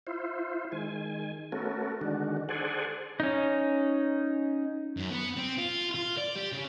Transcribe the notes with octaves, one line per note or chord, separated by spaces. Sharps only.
E4 F4 C5
D#3 G#3 G#5
A3 B3 C#4 F#4 A4 A#4
D3 D#3 G#3 D4 F#4
G#4 A4 C5 D5 F#5 G#5
C#4 D#4
F#2
B3
C4
F4
F4
D5
G4
C#3